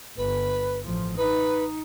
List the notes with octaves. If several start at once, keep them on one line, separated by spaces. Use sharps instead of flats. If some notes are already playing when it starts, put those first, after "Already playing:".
G1 B4
A1 F3
D#4 B4